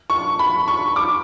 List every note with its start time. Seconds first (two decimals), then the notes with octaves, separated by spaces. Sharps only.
0.10 C#6
0.39 B5
0.68 C#6
0.96 D6